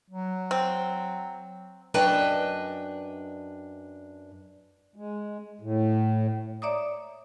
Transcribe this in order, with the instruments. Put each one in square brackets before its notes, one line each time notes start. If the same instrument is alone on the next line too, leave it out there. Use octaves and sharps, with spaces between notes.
[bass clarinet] F#3
[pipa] C4
[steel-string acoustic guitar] F#2 D4 B4 D#5 G5 A5
[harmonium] G#3
A2
[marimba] C#5 D5 E5 A#5 D6 D#6